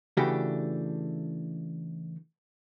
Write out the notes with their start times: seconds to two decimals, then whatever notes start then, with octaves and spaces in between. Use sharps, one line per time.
0.17 C#3 E3 A3 D4 F#4 G4